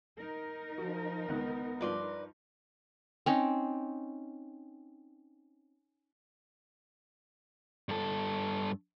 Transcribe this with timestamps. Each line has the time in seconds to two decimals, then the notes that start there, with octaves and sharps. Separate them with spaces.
0.18 D#4 A#4
0.78 F3 F#4
1.28 C#2 D#3 B3 F#6
1.81 G2 F3 F4 B4 D5 C6
3.26 C4 C#4 D#4
7.89 G2 A4